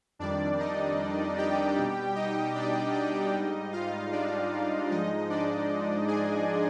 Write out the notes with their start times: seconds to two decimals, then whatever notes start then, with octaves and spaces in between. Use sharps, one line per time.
0.19 F2 D#3 G3 D4 D5
0.59 D#4 D#5
1.38 G4 G5
1.76 B2 G3
2.16 D#4 D#5
2.55 D4 D5
2.94 D#4 D#5
3.34 G#2 G3
3.72 F4 F5
4.12 D4 D5
4.90 G#2 F3 G#3 D#4 D#5
5.30 D4 D5
6.08 G#4 G#5